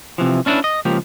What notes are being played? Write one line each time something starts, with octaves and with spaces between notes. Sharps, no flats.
C3 E3 F3
C#4 D4 E4 B4
D#5
C#2 F3 A#3 G4